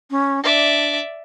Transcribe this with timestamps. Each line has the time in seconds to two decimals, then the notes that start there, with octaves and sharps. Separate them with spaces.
0.10 C#4
0.44 D4 D5 E5